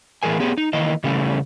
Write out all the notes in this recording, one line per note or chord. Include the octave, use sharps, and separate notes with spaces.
A2 E3 G#4 A#4 G#5
B3 G4 G#4
D#4
D#3 E3 A#3 D#5
C#3 E3 G3 A3 C#4